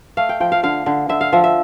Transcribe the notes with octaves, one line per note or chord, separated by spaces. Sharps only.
A3 F5
G5
F3 G5
F5
D3 F5
D3
D3 E5
F5
F3 E5
E5